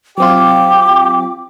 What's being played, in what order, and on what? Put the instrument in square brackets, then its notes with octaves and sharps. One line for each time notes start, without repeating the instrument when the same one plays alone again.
[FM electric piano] F#3 C4 F4 [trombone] G4 [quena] D6